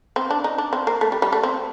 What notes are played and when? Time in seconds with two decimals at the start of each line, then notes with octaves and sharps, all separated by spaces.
0.16 C4
0.30 D4
0.44 D#4
0.58 D4
0.73 C4
0.87 A#3
1.01 A3
1.12 G3
1.22 G3
1.32 A3
1.43 C4